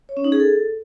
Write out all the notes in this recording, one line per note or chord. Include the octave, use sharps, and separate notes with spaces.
C#5
C#4
D#4
G#4
A4